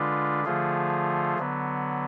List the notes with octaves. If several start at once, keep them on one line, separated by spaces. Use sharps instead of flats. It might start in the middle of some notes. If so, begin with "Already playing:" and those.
Already playing: D3 G#3 D4 F4 B4
D3 F3 A3 F4 G#4
D3 F#3 B3